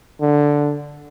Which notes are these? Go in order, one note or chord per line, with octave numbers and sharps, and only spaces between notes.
D3